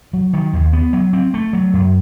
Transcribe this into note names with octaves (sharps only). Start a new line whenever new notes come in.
F#3
D#3
D#2
B3
F#3
C4
A3
F#3
F#2